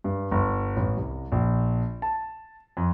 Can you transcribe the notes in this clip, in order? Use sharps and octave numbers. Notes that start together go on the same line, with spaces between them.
G2
G1
A1
C2
A#1
A5
F2